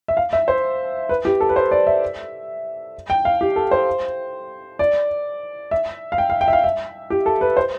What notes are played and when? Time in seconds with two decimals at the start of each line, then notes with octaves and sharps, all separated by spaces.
0.08 E5
0.17 F5
0.33 E5
0.48 C5
1.09 B4
1.25 G4
1.41 A4
1.49 B4
1.56 C5
1.71 D5
1.87 E5
3.10 G5
3.25 F5
3.41 G4
3.56 A4
3.71 C5
4.79 D5
5.71 E5
6.12 F5
6.18 G5
6.30 F5
6.41 G5
6.48 E5
6.53 F5
6.64 E5
7.10 G4
7.26 A4
7.41 B4
7.57 C5